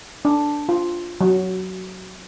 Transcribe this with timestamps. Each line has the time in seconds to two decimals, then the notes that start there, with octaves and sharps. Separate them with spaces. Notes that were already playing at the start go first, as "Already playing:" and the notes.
0.25 D4
0.69 F4
1.21 F#3